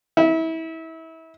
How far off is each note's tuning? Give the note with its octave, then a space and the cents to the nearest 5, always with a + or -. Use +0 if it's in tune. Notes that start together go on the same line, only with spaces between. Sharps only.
E4 -30